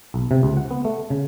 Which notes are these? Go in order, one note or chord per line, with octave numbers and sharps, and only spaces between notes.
B1
C3
C#2
F#5
B3
A3
C#3